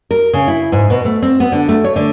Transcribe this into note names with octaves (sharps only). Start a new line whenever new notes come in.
A#4
C#3
E4
G#2
B2
A3
C4
B3
D3
A3
C#5
D3